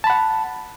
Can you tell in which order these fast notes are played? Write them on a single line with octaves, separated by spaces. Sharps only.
A5 B5 F#5